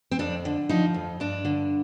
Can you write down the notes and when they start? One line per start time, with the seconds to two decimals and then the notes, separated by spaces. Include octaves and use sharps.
0.11 C4
0.19 F2 D4
0.45 D3
0.69 F3 D#4
0.94 F2
1.20 G2 D4
1.45 D3